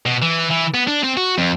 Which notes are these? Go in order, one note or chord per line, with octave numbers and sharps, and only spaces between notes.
B2
E3
E3
B3
D4
C4
F#4
F2